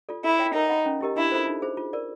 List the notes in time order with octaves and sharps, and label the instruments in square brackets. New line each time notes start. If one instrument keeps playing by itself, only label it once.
[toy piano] F4 A4 D5
[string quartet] E4 [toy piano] A4
[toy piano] C#5 E5 G5
[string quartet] D#4 [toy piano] A#4
[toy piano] D#5 F#5 B5
C#4
E4 G4 A#4 D#5
[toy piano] D4 [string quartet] E4
[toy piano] F4 A4 C5
D#4
G#4 C5
F4
A#4 D5